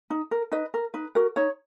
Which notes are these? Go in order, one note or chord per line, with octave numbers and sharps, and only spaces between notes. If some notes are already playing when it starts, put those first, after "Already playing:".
D#4
A#4
D#4 B4 D#5
A#4
D#4 B4
F#4 A#4
D#4 C#5